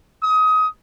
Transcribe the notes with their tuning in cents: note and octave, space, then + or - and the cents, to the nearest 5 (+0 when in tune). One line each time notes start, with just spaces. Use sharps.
D#6 +25